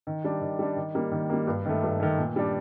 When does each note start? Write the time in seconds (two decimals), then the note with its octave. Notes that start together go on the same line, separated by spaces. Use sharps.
0.07 D#3
0.24 G3 D4
0.41 D#3
0.59 G3 D4
0.76 D#3
0.95 G3 A#3
1.12 D#3
1.30 G3 A#3
1.47 G2
1.65 D#3 A3
1.83 G2
2.00 D#3 A3
2.18 A#2
2.36 G3 D4